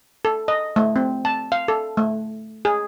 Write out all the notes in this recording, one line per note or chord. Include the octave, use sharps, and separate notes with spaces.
A4
D#5
A3
C4
A5
F5
A4
A3
G#4